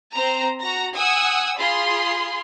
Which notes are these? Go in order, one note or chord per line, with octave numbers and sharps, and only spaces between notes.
C4 C5 A#5
F#4 A#5 A#6
F#5 G#5 D#6 E6
F4 G#4 B5 C6